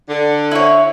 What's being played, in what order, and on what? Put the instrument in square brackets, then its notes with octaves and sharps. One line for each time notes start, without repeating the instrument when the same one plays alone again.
[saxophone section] D3
[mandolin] E4 C#5